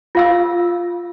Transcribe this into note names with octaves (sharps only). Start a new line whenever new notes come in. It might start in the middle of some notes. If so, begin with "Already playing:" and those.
F4 F5 E6